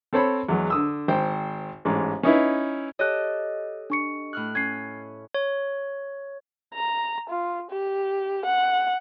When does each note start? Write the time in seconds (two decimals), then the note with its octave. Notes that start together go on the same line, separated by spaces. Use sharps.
0.13 C4 A4 C5 C#5 B5
0.49 E2 F#3 G#3
0.70 D3 D#6 E6
1.08 G#1 C5 G5
1.85 A1 G#2
2.23 C#4 D#4 E4 B4
2.99 G4 A4 C#5 D#5 F#6
3.90 D4 C#6 C#7
4.33 A2 F6 F#6
4.55 C#4 G#6 C7
5.34 C#5
6.74 A#5
7.29 F4
7.70 G4
8.45 F#5